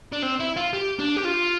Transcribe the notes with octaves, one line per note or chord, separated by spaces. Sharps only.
D4
C4
E4
F4
G4
D4
G4
F4